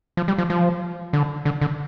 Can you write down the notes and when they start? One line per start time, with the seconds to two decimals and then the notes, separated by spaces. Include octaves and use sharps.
0.17 F3
0.28 G3
0.38 F3
0.50 F3
1.13 D3
1.45 D3
1.61 D3